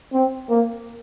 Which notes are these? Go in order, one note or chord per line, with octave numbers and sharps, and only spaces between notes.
C4
A#3